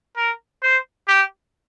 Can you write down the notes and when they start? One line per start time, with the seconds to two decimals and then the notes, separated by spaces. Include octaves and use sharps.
0.17 A#4
0.63 C5
1.08 G4